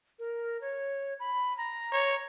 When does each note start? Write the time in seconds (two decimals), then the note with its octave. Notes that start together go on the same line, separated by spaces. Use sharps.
0.19 A#4
0.61 C#5
1.20 B5
1.57 A#5
1.92 C#5